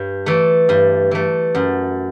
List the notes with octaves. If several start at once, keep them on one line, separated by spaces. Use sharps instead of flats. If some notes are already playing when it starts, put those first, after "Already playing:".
Already playing: G2
E3 A3
G2
E3 A3
F#2